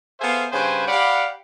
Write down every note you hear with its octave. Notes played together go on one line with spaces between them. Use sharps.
B3 G#4 A4 C5 E5 F5
G2 C#3 B4 C5 G5 G#5
G4 D5 F5 F#5 B5